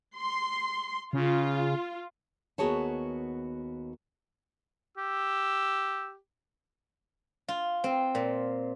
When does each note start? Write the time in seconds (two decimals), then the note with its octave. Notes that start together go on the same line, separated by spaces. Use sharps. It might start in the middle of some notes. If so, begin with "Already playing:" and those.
0.17 C6
1.13 C#3 F4
2.58 D#2 B3 F#4 G#4 C#5 A5
4.97 G4 E6
7.48 F4
7.84 C4
8.15 A#2